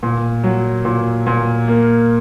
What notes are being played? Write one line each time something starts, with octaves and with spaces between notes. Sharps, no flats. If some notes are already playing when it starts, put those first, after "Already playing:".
A#2
F#3
A#2
A#2
A#3